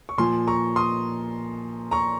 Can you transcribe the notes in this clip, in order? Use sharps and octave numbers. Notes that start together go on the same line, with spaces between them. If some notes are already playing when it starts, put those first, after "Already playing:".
C#6
A#2 F3 G#5 C6
A#5 C#6
C6 D#6
A#5 C#6